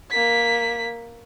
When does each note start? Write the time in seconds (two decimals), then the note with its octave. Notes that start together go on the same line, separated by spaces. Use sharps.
0.10 A#3 B6